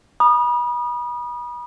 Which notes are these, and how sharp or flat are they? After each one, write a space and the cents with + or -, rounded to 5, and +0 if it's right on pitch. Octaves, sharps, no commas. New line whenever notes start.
B5 -35 D#6 -25